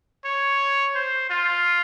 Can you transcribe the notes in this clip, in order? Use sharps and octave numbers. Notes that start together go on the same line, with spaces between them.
C#5
C5
F4